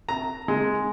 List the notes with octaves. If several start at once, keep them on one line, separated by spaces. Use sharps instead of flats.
A#5
G#3